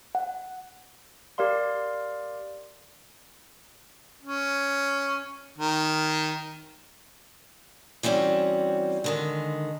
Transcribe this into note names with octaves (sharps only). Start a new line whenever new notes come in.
F#5
G4 A#4 D5 F5 C6
C#4
D#3
E3 G3 C4 C#4 F#4 A4
D3 D#3 G#3